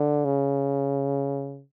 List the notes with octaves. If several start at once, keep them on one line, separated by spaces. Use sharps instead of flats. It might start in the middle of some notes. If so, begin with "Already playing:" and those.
Already playing: D3
C#3